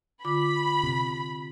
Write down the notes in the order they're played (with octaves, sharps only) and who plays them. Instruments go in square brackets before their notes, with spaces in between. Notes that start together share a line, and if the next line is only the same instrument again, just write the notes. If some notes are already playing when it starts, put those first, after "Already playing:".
[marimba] D3 F4 D6 [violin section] B5
[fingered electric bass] C3